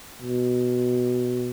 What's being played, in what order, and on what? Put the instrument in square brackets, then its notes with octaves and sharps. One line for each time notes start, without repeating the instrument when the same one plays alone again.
[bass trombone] B2